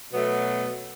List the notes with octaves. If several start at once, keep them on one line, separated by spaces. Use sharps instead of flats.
B2 F#3 A3 B3